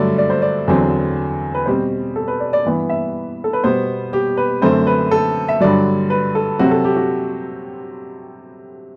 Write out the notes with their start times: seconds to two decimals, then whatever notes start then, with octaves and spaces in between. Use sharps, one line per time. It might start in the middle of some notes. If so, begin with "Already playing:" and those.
Already playing: G2 D3 F#3 A3 D5
0.18 D5
0.30 C5
0.42 D5
0.68 E2 D3 F#3 C4
1.54 B4
1.66 B2 G3 C4 C5
2.16 A4
2.28 B4
2.40 D5
2.53 D5
2.65 G2 E3 B3
2.89 E5
3.44 A4
3.53 B4
3.64 B2 G3 B3 C5
4.13 G4
4.37 B4
4.62 F#2 D3 A3 C4 C5
4.87 B4
5.11 A4
5.48 E5
5.60 G2 D3 F#3 D5
6.10 B4
6.35 A4
6.59 C3 F#3 C4 F#4
6.71 A4
6.84 G4
6.96 F#4